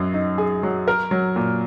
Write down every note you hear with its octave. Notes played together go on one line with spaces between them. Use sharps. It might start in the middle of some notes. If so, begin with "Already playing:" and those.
Already playing: F#2 F#3
D#4
G#4
F#3
A#4
F#3
A#2